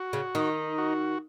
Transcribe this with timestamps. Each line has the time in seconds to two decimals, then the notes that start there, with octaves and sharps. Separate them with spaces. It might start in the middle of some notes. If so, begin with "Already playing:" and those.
Already playing: F#4
0.13 C#3
0.35 D#3 D#4
0.78 F#4